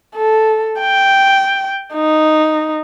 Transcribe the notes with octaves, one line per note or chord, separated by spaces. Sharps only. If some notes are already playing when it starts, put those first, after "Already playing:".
A4
G5
D#4